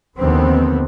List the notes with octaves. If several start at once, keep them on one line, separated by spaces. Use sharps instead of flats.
D#2 D3 D#3 F3 B3 C4